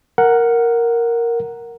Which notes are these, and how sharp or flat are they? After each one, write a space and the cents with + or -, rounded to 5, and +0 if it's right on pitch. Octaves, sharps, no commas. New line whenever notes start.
A#4 +0 F#5 +0